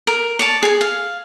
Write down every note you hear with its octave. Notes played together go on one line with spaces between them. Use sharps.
A#4
C#5 D5 A5
G#4 G#5
F5